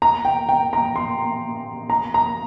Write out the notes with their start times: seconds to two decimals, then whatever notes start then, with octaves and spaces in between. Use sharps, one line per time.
0.02 A#5
0.25 G5
0.49 G5
0.73 A#5
0.96 C6
1.90 A#5
2.14 A#5